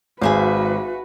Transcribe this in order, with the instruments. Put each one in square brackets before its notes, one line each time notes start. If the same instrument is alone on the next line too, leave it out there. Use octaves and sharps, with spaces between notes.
[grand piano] G#1 [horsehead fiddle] F#4 B4 [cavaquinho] G#4 E5 F5